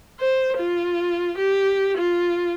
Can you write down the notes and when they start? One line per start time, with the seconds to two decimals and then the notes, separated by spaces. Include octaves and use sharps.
0.20 C5
0.58 F4
1.38 G4
1.98 F4